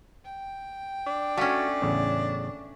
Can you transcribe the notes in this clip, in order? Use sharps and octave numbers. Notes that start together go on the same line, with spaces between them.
G5
D4
A3 C#4 F#4 F5
A1 E2 C#3